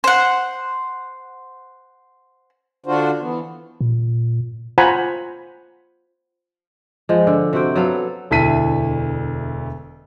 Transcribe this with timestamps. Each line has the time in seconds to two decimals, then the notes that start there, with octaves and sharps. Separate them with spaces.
0.04 C5 F#5
2.86 D3 D4 F4 F#4 C5
3.21 E3 B3
3.81 A#2
4.78 F4 C5 F#5 G#5 A#5 B5
7.09 F3 G#3
7.27 D3
7.53 C3 F#4 G5
7.76 F#3 B3 A4 F5
8.31 E1 D2 E4 A5 B6 D#7